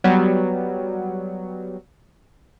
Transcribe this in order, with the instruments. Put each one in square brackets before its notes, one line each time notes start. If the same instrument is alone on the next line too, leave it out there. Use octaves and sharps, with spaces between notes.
[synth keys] F#3 G3 B3